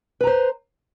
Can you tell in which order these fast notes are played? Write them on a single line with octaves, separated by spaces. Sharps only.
B4 A#5 C5